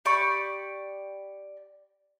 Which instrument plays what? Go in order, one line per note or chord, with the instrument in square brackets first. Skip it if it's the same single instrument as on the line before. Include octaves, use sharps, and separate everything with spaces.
[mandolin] G4 D5 B5 C#6